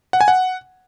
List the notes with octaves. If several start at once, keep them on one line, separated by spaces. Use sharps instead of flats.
F#5
G#5
F#5